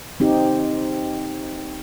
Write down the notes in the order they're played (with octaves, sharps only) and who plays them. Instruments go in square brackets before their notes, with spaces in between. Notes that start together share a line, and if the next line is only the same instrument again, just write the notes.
[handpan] C4 D#4 G4